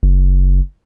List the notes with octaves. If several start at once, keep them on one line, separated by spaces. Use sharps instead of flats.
F#1